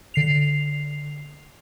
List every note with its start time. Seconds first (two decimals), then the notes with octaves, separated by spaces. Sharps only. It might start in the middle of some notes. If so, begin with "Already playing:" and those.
0.14 D3 C7 F7